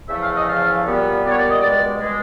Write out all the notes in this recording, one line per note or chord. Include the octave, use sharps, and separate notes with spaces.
E2 C#3 F3 A3 E5
F5
D#5
E2 C#3 F3 A3 F5
A#2 G3 B3
A#2 G3 B3 D5
C#5
D5
D#5
C#2 B2 G#3 D5
B2 G#3